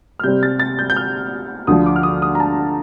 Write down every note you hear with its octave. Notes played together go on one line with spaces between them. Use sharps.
F6
C3 G3 C4 G6
A6
A6
G6
G6
F6
D2 D3 F3 D#6
D6
F6
D#6
D#6
A#5
A5